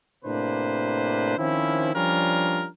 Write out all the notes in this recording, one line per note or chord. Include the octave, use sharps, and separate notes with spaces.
A2 C3 A#3 D4 B4 C5
D#3 F3 C4 C#4 E4
F3 G3 C#4 D4 F4 A#4